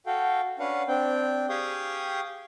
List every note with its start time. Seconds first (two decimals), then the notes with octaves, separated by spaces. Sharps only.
0.06 F#4 A4 F5 G5
0.59 C#4 D4 B4 F5 F#5
0.88 C4 D4 G5
1.49 G4 G#4 F5 G5 C#6 D#6